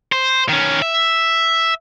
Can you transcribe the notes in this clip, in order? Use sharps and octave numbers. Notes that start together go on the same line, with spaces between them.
C5
D#3 C#4
E5